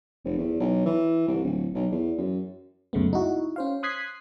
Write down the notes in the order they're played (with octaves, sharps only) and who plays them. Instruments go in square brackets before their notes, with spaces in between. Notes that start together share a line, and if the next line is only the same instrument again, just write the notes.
[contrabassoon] F1
E2
B1
E3
C2
D1
B1
E2
F#2
[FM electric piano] C#2 F#2 C#3 G#3 A3 B3
D#4 E4 F#4
C#4 C5 F5
C6 D#6 F#6 G#6 B6 C7